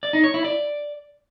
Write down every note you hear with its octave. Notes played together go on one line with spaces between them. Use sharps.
D5
D#4
C#5
E4
D5